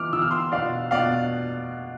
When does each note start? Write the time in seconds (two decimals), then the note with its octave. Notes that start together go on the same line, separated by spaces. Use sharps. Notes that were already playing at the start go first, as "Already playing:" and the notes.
Already playing: E3 B3 F4 D6 F6
0.13 E3 B3 F4 E6
0.22 F6
0.31 C6 E6
0.52 B2 B3 D4 F4 D5 F5
0.91 B2 B3 D4 F4 D5 F5